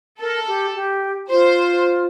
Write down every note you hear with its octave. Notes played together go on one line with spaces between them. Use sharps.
A4 A#4
G4
G4
F4 C5